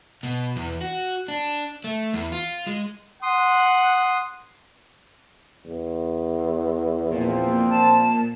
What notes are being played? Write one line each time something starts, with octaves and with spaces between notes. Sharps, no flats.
B2
E2
F#4
D4
A3
E2
F4
G#3
F#5 C6 D#6
E2
A#2 F3 C4
A5